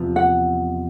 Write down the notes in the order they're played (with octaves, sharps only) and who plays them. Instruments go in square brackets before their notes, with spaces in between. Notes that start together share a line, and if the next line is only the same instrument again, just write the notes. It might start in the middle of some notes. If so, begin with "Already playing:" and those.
Already playing: [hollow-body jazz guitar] E2 C3 F3
[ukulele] F#5